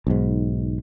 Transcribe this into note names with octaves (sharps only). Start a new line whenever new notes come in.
B1 G#2